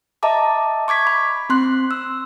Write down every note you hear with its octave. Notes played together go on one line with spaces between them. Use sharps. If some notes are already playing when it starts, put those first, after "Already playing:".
D#5 E5 A5 A#5 D6
C#6 D6 G#6 B6
B5
C4 C6 F#6
E6